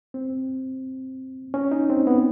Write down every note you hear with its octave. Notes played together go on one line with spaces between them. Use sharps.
C4
C#4
D#4
C4
B3